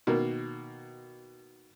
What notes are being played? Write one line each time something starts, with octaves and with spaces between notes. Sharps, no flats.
B2 D#3 A#3